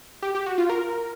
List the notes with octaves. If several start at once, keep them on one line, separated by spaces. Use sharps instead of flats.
G4
G4
F#4
F4
A#4